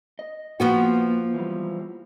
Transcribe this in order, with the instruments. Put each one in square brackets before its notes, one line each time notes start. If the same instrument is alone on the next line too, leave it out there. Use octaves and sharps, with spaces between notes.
[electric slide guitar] D#5
[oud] F3 B3 F#4 [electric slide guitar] A#3
[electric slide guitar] E3 F#3 G3